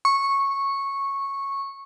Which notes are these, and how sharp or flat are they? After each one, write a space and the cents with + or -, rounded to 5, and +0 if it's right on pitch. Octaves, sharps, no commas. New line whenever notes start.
C#6 -10